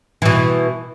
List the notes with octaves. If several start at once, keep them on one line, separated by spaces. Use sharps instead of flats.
B2 E3